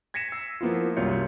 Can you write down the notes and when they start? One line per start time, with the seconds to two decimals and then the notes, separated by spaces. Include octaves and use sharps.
0.14 G#6 A#6 B6 C#7 D#7 E7
0.32 E6 C7
0.61 F3 A#3 B3 E4 F4
0.97 C2 F#2 F4 C#5 G6 C#7